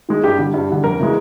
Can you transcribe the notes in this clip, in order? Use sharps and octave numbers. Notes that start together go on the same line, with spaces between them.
D#3 G#3
G2 G4
D3 G3
G2
D3 G3
F2 A#4
C#3 E3 G#3